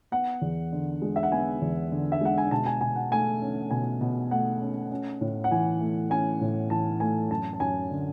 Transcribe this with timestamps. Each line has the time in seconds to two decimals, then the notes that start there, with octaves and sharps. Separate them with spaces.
0.12 B3 F#5
0.41 E2
0.73 D3
1.02 G#3
1.16 E5
1.23 F#5
1.32 B3 G#5
1.62 E2
1.92 D3
2.12 E5
2.21 G#3 F#5
2.38 G#5
2.51 B2 A5
2.66 G#5
2.81 B2 G#5
2.96 F#5
3.11 A3 G#5
3.42 C#4
3.71 B2 G#5
4.01 B2
4.31 A3 F#5
4.61 C#4
4.91 C#4
5.21 A2
5.44 F#5
5.51 E3 G#5
5.81 A3
6.10 C#4 G#5
6.41 A2
6.70 E3 A5
7.00 A3 G#5
7.30 F#2 A5
7.53 A5
7.60 F#2 G#5
7.90 D3